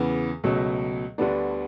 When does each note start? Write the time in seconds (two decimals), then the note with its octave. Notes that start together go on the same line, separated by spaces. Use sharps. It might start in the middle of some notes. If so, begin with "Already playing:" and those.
Already playing: E2 C#3 E3 B3
0.44 C#2 B2 F#3 A3
1.18 D2 D3 G3 B3 D4